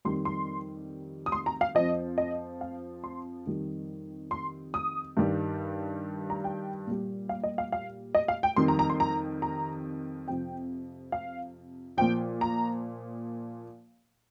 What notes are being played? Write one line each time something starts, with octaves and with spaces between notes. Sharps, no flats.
F2 D#3 G3 C6
C6
D#6
C6
A#5
F5
F2 F3 D#5
D#5
F5
C6
F2 D#3 G3
C6
D#6
G2 D#3 G3
A#5
G5
A#2 G3
F5
D#5
F5
F5
D#5
F5
G5
F2 D#3 G3 C6
A#5
A#5
C6
A#5
A#5
F2 C3 F3 G5
F5
A#2 F3 G5
A#5